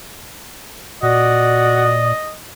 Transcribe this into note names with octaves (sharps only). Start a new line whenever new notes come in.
A#2 F#4 D5 D#5